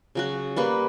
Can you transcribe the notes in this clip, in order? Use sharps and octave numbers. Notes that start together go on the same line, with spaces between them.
C#3 F#3 F#4
G3 A#3 B4